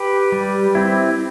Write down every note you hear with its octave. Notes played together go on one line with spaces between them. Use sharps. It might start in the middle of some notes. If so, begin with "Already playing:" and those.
Already playing: G4 B4
G3
C4 E4